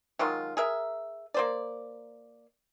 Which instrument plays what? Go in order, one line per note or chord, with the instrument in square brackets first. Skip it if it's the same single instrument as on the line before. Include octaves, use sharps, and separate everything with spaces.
[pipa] D#3 F#3 G#3 F4
G#4 A#4 E5
A#3 C5 D5